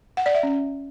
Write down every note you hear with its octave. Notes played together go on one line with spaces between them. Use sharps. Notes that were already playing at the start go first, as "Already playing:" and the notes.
F#5
D5
E5
C#4